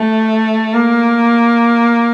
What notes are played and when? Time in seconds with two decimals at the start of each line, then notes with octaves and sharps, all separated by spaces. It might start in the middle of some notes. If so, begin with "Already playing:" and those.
Already playing: A3
0.73 A#3